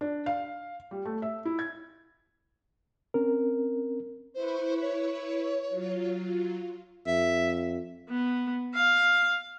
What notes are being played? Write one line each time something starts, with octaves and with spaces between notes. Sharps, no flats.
D4
F5
G3
A3
E5
E4
G#6
C4 C#4 A#4
E4 B4 C5 C#6
C#5
F#3 F4
F2 E5
B3
F5